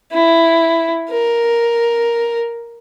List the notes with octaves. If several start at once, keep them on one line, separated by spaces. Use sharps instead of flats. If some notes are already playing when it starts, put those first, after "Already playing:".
E4
A#4